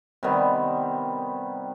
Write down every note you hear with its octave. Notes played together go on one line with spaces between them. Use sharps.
C3 D#3 G3 B3